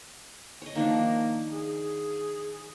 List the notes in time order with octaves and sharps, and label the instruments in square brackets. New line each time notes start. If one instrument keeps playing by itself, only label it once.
[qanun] C#5 D#5
[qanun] D#3 F3 D4 [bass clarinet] A#3
[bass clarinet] G#4